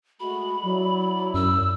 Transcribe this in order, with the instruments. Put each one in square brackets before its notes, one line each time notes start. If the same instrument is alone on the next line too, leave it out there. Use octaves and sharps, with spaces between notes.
[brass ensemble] G#3 A3 F#4 [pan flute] B5
[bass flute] F#3 [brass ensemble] E4 D5
[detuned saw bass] F#2 [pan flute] E6